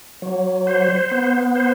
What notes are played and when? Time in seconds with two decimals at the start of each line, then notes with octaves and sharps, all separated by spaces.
0.22 F#3
0.67 C5
1.11 B3
1.55 C5